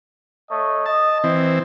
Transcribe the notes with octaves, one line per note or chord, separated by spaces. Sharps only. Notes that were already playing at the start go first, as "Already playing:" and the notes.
A3 C#5 D#5
D#5 A5
E3 C4